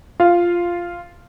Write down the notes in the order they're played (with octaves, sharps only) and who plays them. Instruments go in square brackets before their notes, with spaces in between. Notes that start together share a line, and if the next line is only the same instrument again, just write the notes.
[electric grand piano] F4 F5